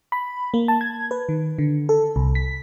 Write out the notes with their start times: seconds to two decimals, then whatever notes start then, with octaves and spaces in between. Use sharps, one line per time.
0.12 B5
0.54 A#3
0.68 A5
0.81 G#6
1.11 B4
1.29 D#3
1.59 D3
1.89 A4
2.16 C2
2.35 B6